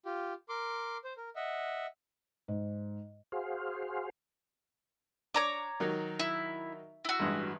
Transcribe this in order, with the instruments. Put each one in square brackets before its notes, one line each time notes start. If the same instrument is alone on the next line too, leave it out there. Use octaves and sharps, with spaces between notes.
[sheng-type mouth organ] F4 G4
A#4 C6 D6
C5
A#4
D#5 E5 F#5
[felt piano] G#2
[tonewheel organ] F#4 G#4 C5 F5
[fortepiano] D4 [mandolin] C#5 A#5 D6
[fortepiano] D#3 F#3 D#4
[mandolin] E4
E4 F#4
[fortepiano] A1 G2 G#3